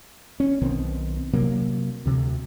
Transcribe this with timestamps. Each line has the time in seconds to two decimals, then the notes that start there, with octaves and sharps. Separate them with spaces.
0.40 C#4
0.61 B1 B2 D#3 C4
1.33 C3 F#3 A#3
2.06 D2 C3